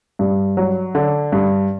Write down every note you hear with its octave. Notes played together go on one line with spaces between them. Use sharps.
G2
F#3
D3
G2